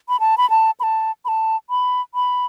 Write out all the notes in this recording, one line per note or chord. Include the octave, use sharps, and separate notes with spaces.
B5
A5
B5
A5
B5
A5
B5
A5
B5
B5